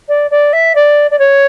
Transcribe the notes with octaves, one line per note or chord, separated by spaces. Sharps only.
D5
D5
E5
D5
D5
C#5